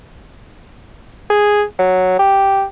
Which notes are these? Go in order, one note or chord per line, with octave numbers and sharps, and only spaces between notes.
G#4
F#3
G4